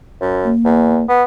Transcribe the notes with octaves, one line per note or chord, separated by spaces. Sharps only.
F#2
A#3
E2
B3